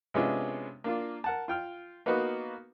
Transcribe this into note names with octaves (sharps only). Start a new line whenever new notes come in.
C3 G#3 B3 C#4 D4 F4
A#3 D4 F4
A#4 F#5 A5
F4 G5 F6
A#3 B3 D#4 F#4 B4